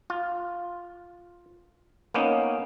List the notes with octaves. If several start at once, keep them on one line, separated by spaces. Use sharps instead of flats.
F4
A#3 B3 C#4 D#4